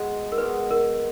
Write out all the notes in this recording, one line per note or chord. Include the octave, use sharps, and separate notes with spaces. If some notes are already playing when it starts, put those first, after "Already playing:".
Already playing: G#3 B3 F#4
A#4
G#3 B3 F#4 B4
A#4